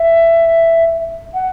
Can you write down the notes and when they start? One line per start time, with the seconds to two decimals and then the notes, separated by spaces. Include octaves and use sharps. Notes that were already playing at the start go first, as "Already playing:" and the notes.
Already playing: E5
1.34 F#5